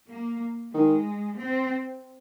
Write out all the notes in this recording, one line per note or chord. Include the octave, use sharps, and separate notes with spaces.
A#3
D#3 G#3
C4